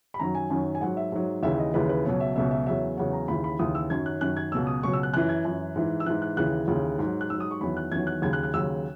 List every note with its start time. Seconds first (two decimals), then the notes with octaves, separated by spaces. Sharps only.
0.14 B5
0.20 F#2 D#3 F#3 A#5
0.35 G#5
0.50 F#2 D#3 F#3
0.75 G#5
0.81 G#2 F#3 F#5
0.97 E5
1.12 G#2 F#3
1.43 D#2 C#3 E3 E5
1.54 E5
1.59 D#5
1.74 D#2 C#3 E3 B4
1.89 B4
2.05 C#2 B2 F#3 C#5
2.20 E5
2.36 C#2 B2 F#3 E5
2.51 E5
2.66 E2 C#3 F#3 E5
2.97 E2 C#3 F#3 F#5
3.13 A#5
3.28 D#2 C#3 E3 B5
3.44 B5
3.59 D#2 C#3 E3 D#6
3.75 E6
3.90 F#2 D#3 F#3 G#6
4.06 F#6
4.21 F#2 D#3 F#3 F#6
4.37 G#6
4.52 C#2 B2 F#3 E6
4.67 D#6
4.83 C#2 B2 F#3 C#6
4.93 E6
5.03 F#6
5.13 F#2 E3 F#6
5.29 G#6
5.45 F#2 E3
5.76 G#2 E3
6.00 E6
6.06 G#2 E3 F#6
6.22 F#6
6.37 D#2 C#3 E3 F#6
6.68 D#2 C#3 E3
6.99 G#2 F#3
7.21 F#6
7.30 G#2 F#3 E6
7.40 D#6
7.51 C#6
7.61 E2 D#3 F#3 B5
7.77 F#6
7.92 E2 D#3 F#3 G#6
8.07 F#6
8.22 D#2 C#3 F#3 G#6
8.33 F#6
8.43 F#6
8.54 D#2 C#3 F#3 E6